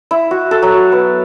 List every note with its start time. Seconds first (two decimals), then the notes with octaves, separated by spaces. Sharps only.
0.11 E4
0.31 F#4
0.51 A4
0.63 F#3
0.92 B3